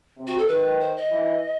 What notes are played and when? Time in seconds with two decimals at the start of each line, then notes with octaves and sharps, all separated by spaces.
0.18 C3
0.27 F#4
0.38 A4
0.48 D#3 B4
0.80 C5
0.96 D#5
1.12 E3